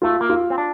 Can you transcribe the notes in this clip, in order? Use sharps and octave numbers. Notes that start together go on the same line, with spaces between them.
A3 F4
A#3
F4
C4
D4